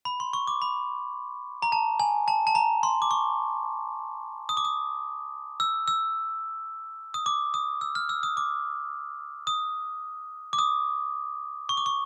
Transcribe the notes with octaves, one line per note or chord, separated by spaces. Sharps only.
B5
C6
C#6
D6
B5
A#5
A5
G#5
A5
A5
A#5
C6
D6
C#6
D#6
D6
D#6
E6
E6
D#6
D6
D#6
E6
F6
E6
D#6
D6
D#6
D6
D#6
C#6
D6
C#6